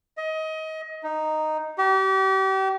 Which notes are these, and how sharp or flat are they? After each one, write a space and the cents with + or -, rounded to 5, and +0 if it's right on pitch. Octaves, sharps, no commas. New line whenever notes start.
D#5 +25
D#4 -5
G4 -35